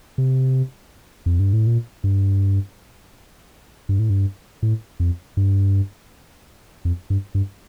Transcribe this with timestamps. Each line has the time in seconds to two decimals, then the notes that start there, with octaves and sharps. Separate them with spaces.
0.18 C3
1.26 F2
1.40 G2
1.53 A2
1.67 A#2
2.04 G2
3.89 G2
3.99 A2
4.10 G2
4.63 A2
5.00 F2
5.37 G2
6.85 F2
7.10 G2
7.35 G2